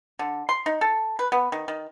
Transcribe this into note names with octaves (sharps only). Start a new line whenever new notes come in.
D3
C6
D#4
A4
B4
B3
D#3
D#3